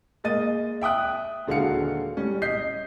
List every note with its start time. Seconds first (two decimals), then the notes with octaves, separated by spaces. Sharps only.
0.24 G#3 A#3 D#5 A6 D#7
0.81 E5 G5 D#6 F#6
1.48 D#1 D3 G#3 F#4 F5 C#7
2.17 G3 C#4
2.42 D#5 G6 B6 C7